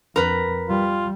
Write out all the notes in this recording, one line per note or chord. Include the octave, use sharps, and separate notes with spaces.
F2 A#4 B4
G3 F4